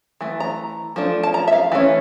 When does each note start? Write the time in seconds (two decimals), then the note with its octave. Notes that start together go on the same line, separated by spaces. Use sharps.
0.21 E3 A3
0.40 A#5
0.96 F3 A3 D4
1.23 A5
1.34 A#5
1.48 E5
1.53 F5
1.72 E3 A3 C#4